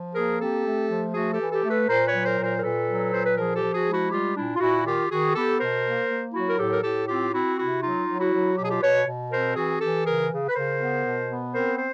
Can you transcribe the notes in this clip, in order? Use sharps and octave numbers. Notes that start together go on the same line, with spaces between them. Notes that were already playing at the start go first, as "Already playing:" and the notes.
Already playing: F3
A#3 G#4 A#4
C4 G4 A4
A3
F3
A3 F#4 G#4
G4 A4
E3
G4 A4
A3
A4 B4
A#2 A#4 C5
B4 C#5
F#3
A#4 C5
A#2
A#4 C5
A#4
A#2 A4 B4
F#3
A#2 C5
B4
F3 G#4 A#4
G4 A4
F3
F#4 G#4
G#3
E4 F#4
G3 F4 G4
A#2 D4 E4
F4
A#2 E4 F#4
D#3 F4 G4
D#3 F#4 G#4
B3 G4 A4
B2 A#4 C5
A#3
A#3
F#3 E4 F#4
A#4
A2 G4 A4
A#4
A2 G4 A4
C4 F4 G4
C4 E4 F#4
C3 E4 F#4
F#3 D#4 F4
F#3
E4 F#4
F#3
B2 G4
G#4
F4 G4
B2 B4 C#5
B2
C4 A#4 C5
E3 F#4 G#4
E3 G4 A4
C#3 G#4 A#4
C#3
B4
C#3 A#4 C5
B3
B2
B3
C4 A#4 C5
C5